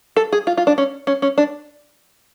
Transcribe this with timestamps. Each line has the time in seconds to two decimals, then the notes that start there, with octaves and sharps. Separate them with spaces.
0.16 A4
0.32 G#4
0.47 F4
0.57 F4
0.67 D4
0.78 C#4
1.07 C#4
1.22 C#4
1.38 D4